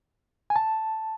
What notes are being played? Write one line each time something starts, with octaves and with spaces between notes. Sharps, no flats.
G#5
A5